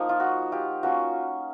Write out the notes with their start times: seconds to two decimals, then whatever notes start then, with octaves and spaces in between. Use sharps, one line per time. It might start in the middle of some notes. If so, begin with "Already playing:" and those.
Already playing: F3 A#3 D#4
0.09 F4
0.20 F#4
0.52 F4 G4
0.83 A#3 C#4 F4 F#4